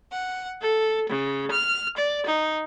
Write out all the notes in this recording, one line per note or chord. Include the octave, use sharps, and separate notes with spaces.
F#5
A4
C#3
F6
D5
D#4